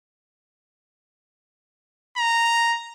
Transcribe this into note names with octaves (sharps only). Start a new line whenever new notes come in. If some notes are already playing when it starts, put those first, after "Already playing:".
A#5